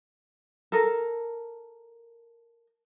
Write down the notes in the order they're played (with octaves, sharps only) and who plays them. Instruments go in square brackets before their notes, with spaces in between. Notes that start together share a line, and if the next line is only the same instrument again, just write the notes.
[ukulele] A4 A#4